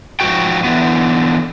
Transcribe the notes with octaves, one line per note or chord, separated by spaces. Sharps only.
G#2 F3 F#4 G5
D3 E3 B3